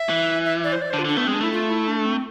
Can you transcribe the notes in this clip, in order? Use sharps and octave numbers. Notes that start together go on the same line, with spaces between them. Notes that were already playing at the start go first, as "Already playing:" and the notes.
Already playing: E5
E3
E5
D5
C5
D5
C5
D3
F4
D3 D4
A3 B3
G#3 C4
D4
A3 E4
F4
E4
D4
C4